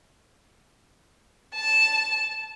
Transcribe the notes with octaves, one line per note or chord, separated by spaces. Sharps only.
A5